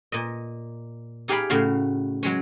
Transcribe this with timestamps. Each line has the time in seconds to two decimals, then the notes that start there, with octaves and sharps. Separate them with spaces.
0.12 A#2 D#5
1.28 D#4 G4 G#4 F5 G5 B5
1.50 A2 C#3 F#4 F5
2.23 F#3 G#3 C#4